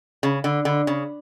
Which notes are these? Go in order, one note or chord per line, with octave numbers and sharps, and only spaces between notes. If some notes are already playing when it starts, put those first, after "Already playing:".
C#3
D3
D3
C#3